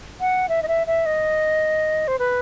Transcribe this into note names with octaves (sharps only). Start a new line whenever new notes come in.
F#5
E5
D#5
E5
E5
D#5
C5
B4